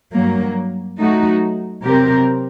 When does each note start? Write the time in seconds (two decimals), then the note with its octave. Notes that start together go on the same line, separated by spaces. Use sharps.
0.14 G2 F#3 A#3
0.98 F#3 A3 D#4 F#4
1.83 C3 F#3 C4 G4 A#4